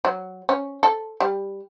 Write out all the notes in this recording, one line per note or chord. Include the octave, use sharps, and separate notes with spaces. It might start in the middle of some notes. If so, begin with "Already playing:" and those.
F#3
C#4
A4
G3